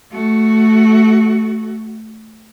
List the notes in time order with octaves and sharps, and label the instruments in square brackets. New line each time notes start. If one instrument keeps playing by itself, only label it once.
[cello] A3 F#4